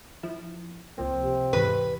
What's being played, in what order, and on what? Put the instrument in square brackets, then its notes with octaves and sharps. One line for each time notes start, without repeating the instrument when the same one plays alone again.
[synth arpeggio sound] F3 E4
[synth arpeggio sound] C#2 F3 A#3 [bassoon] C4
[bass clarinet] C3
[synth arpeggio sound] E2 G#2 E3 [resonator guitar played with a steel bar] B4